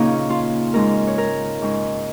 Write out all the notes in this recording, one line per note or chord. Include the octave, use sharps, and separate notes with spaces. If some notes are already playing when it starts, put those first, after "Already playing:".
Already playing: A#2 C#3 A#3 C#4 D#4 F4
F4
G#2 G#3 C#4 A#4
C#5
A#4
G#2 G#3 C#4